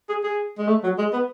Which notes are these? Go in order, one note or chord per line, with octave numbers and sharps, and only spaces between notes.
G#4
G#4
G#3
A3
F#3
G#3
B3